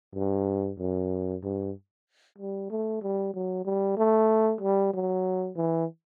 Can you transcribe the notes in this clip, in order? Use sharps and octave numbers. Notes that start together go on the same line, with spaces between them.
G2
F#2
G2
G3
A3
G3
F#3
G3
A3
G3
F#3
E3